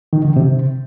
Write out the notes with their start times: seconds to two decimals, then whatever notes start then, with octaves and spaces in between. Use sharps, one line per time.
0.13 D#3
0.25 D3
0.36 C3